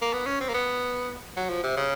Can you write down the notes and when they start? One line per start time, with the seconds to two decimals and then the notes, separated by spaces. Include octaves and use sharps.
0.02 A#3
0.13 B3
0.26 C#4
0.40 C4
0.49 A#3
0.54 B3
1.37 F#3
1.49 F3
1.63 C3
1.77 C#3